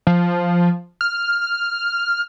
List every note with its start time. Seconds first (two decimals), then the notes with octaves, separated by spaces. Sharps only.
0.07 F3
1.01 F6